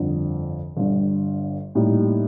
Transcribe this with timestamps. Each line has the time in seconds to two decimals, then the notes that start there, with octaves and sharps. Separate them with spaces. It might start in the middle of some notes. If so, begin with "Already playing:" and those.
Already playing: G1 F2 D3
0.77 G1 G2 D3
1.75 A2 G3 A#3 D#4 G4